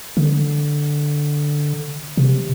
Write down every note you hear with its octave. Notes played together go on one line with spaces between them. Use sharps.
D3
C3